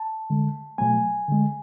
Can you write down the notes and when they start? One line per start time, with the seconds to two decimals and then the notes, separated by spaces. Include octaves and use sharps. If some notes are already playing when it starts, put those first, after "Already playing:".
Already playing: A5
0.30 D3 G#3
0.78 B2 F#3 A3 G#5
1.28 D3 G#3